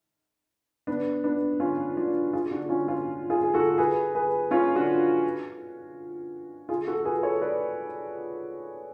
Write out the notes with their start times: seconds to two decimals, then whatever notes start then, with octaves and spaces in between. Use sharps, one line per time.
0.87 B3 D4
1.24 B3 D4
1.60 C#4 F4
1.97 D4 F#4
2.33 F4 G#4
2.51 D4 F#4
2.69 C#4 F4
2.87 C#4 F4
3.30 F4 G#4
3.43 G#4
3.54 F#4 A4
3.78 G#4 B4
4.15 G#4 B4
4.51 C#4 F4
4.75 D4 F#4
6.69 F4 G#4
6.87 F#4 A4
7.05 G#4 B4
7.23 A4 C#5
7.41 B4 D5